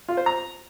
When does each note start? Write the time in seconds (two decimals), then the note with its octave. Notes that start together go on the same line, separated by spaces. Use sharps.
0.09 F4
0.17 C5
0.26 A#5